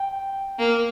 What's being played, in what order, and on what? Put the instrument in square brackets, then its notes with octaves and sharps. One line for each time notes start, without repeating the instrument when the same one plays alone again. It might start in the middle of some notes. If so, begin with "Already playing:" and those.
Already playing: [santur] G5
[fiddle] A#3